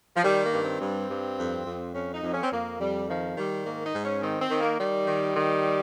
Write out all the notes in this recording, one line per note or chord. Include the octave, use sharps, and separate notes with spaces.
F3
D#3 G3
A#3
G2
C4
G2
G2
F2
F2
F2 C#4
D#4
F2
C#4
C4
F2 A#3
F2 G3
D#3 F3
D#3 G3
G#2 A#3
D#4
G#2
C#4
D#3 C4
C4
D#3
A#3
D#3 G3
D#3
D#3